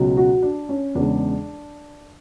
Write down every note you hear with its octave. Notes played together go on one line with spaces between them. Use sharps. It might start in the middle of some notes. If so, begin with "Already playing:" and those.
Already playing: C#2 B2 F#3
F#4
D4
C#4
E2 C#3 G#3 D4